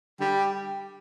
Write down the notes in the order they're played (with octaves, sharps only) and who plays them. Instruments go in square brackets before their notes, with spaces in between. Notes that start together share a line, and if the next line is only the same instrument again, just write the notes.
[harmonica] D3 G3 [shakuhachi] G5